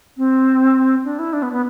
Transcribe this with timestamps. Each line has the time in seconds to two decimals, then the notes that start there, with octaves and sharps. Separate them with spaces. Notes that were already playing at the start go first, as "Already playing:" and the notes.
0.17 C4
1.04 D4
1.19 E4
1.33 D4
1.42 B3
1.52 B3